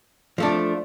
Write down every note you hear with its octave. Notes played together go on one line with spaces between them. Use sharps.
F3 A3 D4